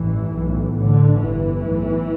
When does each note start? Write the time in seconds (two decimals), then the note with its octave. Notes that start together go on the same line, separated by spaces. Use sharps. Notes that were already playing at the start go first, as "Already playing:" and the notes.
Already playing: A1 G2 E3
0.35 B1 A2
0.77 A1 A2 D3
1.21 G1 G2 E3
1.65 B1 A2